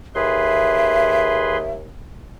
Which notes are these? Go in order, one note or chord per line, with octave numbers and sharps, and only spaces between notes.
D#2 G#4 B4 E5 C6